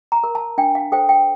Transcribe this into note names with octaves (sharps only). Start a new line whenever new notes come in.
A#5
A#4
A5
D4 G5
F5
A4 C5 G5
G5